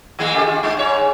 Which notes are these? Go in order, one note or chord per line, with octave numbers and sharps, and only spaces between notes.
D#3 G#3 A#3
C#3 G4 A4
F4
G#3 D#4
G#2 C#5
D#2